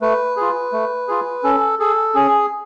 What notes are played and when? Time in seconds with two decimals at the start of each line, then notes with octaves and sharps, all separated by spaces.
0.01 A3 B4
0.37 F4 G#4
0.72 A3
1.08 F4 G#4
1.44 C#4 A4
1.79 G#4 A4
2.15 C#4 G#4